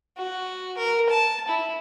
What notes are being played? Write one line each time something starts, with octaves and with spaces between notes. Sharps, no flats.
F#4
A#4
A5
E4